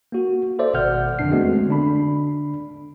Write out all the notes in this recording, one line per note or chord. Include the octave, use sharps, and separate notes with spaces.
A#3 F#4
A4 C5 D5 E5
G#1 B2 F#5 F6 G6
F2 D3 D#3 D4 C7
G#3 A3 B3 C4 F#4
D3 D4 B5